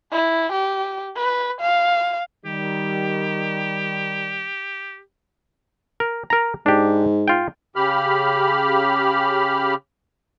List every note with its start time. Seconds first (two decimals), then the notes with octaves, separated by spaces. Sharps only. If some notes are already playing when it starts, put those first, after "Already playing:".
0.12 E4
0.52 G4
1.16 B4
1.61 F5
2.45 D#3 G3 G4
6.00 A#4
6.30 A#4 A#5
6.66 G#2 D4 G4
7.28 F4 G5
7.76 C#3 G4 B5 F6